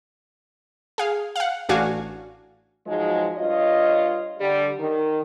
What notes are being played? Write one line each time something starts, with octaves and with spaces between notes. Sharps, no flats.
G#4 F5
F5 F#5
A1 A2 D4 F#4 F5 G#5
G#2 F3 F#3 G#3
G2 F4 C#5 D#5
D3 G3
D#3